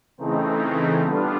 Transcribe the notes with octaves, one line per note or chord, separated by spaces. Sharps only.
C#3 E3 A3 C4 D#4
D3 G3 B3 D4 F4